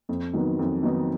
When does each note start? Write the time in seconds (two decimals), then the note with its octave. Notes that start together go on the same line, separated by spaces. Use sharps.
0.09 F2
0.33 D#3 F#3 B3 D#4
0.59 F2
0.83 D#3 F#3 B3 D#4